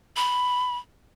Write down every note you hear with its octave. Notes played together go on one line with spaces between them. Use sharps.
B5